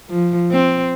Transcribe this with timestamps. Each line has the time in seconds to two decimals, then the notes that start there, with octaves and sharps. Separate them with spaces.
0.10 F3
0.51 C4